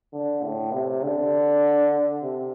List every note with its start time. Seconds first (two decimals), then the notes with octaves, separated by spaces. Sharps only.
0.13 D3
0.42 A2
0.72 C3
1.03 D3
2.22 C3